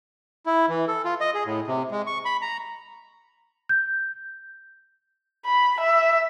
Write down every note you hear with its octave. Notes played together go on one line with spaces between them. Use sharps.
E4
E3
A4
F4
D#5
G#4
A2
C3
G#3
C#6
B5
A#5
G6
B5
E5